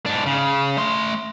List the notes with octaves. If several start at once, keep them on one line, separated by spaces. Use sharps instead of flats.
G#2 D4
C#3
A3 C6